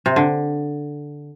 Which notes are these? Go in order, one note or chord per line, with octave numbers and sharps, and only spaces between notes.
C3
D3